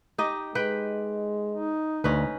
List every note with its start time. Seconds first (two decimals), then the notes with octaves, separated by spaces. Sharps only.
0.18 D#4 G4 D#5
0.55 G#3 B4 G5
1.51 D#4
2.04 D2 C#4 D#4 B4